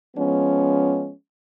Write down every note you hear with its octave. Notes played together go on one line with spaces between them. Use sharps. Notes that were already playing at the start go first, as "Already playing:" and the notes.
F3 G#3 B3 C#4